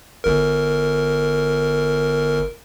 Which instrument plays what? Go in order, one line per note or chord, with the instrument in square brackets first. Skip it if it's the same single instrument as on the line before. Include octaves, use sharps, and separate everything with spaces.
[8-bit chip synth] G1 A#4